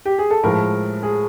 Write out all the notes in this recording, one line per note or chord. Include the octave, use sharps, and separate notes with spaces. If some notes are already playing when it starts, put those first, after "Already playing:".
G4
G#4
A4
A2 F3 G#3 A#4
G#4